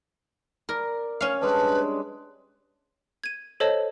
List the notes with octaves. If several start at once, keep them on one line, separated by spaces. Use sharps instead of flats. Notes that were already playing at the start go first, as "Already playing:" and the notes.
A#4 D5
C#4 F5
G3 G#3 D4 B4
G#6 D#7
A4 C5 C#5 D#5 A5